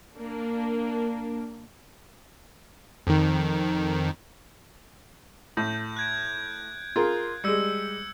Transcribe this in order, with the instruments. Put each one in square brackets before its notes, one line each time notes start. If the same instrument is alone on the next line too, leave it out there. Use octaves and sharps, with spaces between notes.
[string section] A#3 D4
[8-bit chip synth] F2 D#3
[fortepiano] A2 [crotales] G6
[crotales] F#6 G#6 D7
[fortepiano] F4 G#4 A#4
[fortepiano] G3 G#3 [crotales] E6 C#7